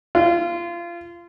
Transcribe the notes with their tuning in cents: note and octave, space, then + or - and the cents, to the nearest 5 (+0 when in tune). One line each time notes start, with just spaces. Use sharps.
F4 -25